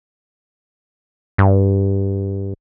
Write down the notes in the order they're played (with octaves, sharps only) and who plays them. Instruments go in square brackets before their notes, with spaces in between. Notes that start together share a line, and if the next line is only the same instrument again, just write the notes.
[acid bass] G2